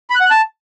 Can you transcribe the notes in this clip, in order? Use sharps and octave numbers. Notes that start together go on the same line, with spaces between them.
B5
F#6
F#5
F#6
A5